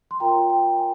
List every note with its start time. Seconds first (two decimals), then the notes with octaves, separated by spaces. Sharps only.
0.11 C6
0.20 F4 A#4 C#5 G5 A#5
0.50 G5
0.78 G#5